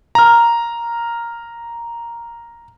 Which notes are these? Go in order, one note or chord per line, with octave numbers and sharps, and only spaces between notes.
A#5 F6